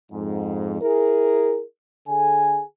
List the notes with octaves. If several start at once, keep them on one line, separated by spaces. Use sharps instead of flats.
F2 G#2
E4 G#4 A#4
D3 G#4 A4 G#5